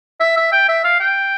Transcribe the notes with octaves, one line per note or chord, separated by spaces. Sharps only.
E5
E5
G5
E5
F5
G5